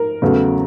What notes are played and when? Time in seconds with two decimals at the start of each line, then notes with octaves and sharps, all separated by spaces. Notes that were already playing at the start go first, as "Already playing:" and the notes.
Already playing: A#4
0.22 E2 C#3 F#3 A3